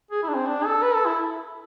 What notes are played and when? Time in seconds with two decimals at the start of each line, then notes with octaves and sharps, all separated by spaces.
0.11 G#4
0.23 E4
0.29 D4
0.35 C4
0.47 D4
0.65 A4
0.82 B4
0.94 A4
1.06 E4